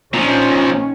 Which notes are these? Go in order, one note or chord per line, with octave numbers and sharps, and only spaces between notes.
A#2 D#3 F3 C#4